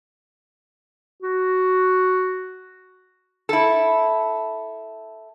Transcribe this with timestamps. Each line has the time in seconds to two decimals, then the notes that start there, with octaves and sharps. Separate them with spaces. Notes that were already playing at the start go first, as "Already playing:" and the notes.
1.23 F#4
3.49 E4 A4